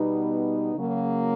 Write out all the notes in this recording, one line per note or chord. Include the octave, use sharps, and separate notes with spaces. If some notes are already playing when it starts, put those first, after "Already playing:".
Already playing: B2 G3 B3 D#4
C#3 F#3 A#3